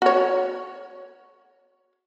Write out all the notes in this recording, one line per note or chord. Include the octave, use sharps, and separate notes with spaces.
F#4 C#5